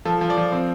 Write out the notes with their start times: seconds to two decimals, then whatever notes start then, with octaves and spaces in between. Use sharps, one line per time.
0.05 F3 A4
0.21 F3
0.30 D5
0.37 F3
0.52 C4